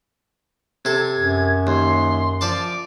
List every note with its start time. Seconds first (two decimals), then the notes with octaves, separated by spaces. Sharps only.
0.85 C3 A4 G#6
1.16 F#2
1.67 D#2 C6
2.41 F3 D5 A5 D6